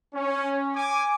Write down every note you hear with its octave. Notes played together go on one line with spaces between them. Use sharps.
C#4
G#5 D6